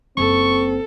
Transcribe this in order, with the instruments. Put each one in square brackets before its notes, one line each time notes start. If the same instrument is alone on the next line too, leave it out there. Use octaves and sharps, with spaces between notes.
[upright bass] F#1 [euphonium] C4 [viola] A4 [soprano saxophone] C#6